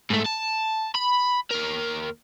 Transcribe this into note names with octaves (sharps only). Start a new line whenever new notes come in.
G#2 A3
A5
B5
D#2 A#4